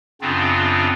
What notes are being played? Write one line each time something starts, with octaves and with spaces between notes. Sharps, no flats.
F#2 C#3 B3 C4 D4 F4